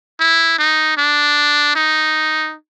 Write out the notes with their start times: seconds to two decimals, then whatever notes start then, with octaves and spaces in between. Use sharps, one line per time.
0.20 E4
0.59 D#4
0.98 D4
1.76 D#4